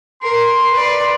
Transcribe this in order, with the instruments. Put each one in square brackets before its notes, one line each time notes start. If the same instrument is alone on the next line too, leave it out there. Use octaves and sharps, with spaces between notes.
[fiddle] A#4 [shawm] C6
[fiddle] B4 D5